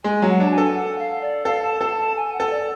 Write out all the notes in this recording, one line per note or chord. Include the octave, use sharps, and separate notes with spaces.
G#3 G#5
F#3
F#5
D4 A5
G#5
A4
F#5
F5
D5
A4 F5
A5
A4 A5
A5
G#5
F#5
A4
D5